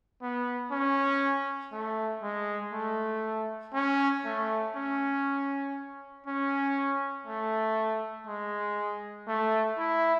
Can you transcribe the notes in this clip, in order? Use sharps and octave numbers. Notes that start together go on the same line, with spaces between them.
B3
C#4
A3
G#3
A3
C#4
A3
C#4
C#4
A3
G#3
A3
E4